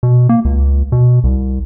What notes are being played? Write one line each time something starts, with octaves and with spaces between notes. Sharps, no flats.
B2
A#3
C#2
B2
C2